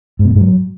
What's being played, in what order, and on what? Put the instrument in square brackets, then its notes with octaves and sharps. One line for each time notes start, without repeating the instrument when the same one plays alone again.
[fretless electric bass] G#2
B2
G2
G#2
F#3